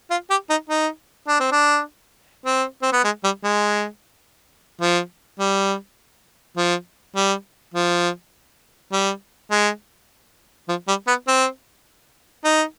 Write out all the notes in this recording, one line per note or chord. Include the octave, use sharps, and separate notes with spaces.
F4
G4
D#4
D#4
D4
C4
D4
C4
C4
B3
G#3
G3
G#3
F3
G3
F3
G3
F3
G3
G#3
F3
G3
B3
C4
D#4